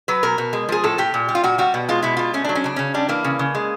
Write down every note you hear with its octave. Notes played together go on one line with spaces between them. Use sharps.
F#3 B4
B2 A#4
B2
G#3
F3 G#4
A2 A4
A2 G4
A#2
G3
F4
A#2 F#4
G3 F#4
B2
G#3 F4
B2 E4
G#3 F4
A3 C#4
F#3 D4
C#4
C#3 D4
C#3 C#4
G3 D4
E3 A#3
C#3
C#3
G#3